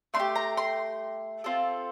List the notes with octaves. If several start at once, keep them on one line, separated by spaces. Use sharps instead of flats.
A3 D4 C6
G4
A#5
C6
C4 F4 A4